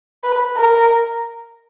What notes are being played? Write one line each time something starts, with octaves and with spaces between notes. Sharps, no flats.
B4
A#4